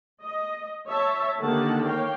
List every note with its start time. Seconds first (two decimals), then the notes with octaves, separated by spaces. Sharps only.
0.22 D#5
0.88 C#5 E5 A5
1.38 D3 D#3 A#3 G4 F#5 A5
1.84 A#3 C#5 F5 G5